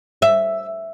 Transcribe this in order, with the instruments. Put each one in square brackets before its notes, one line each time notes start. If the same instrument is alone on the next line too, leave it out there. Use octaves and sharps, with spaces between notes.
[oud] E5